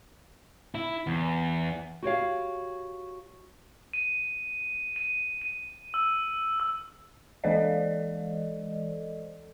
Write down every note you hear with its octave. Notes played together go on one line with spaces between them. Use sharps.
E4
E2
F#4 G4 C#5 F5
D#7
D#7
D#7
E6
E6
E3 G#3 A4 C5 D5 D#5